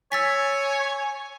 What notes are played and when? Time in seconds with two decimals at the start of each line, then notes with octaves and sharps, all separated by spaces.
0.12 C#5 G#5 E6 A6 B6